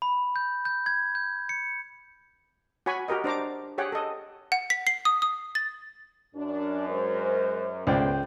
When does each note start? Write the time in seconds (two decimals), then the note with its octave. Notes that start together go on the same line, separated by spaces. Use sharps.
0.02 B5
0.36 G6
0.65 G6
0.86 G#6
1.15 G6
1.49 C#7
2.86 F#4 C#5 G#5 B5 C#6
3.08 F#4 G4 A#4 D#5
3.24 D4 C5 A#5 D6
3.78 G4 G#4 C#5 F#5 G5
3.92 A4 D#5
4.52 F#5
4.70 B6
4.87 C7
5.05 D#6
5.22 D#6
5.55 A6
6.35 F#2 D4
6.89 G#3 A#4 C5
7.87 C#2 A3 B3 C5 D5 G5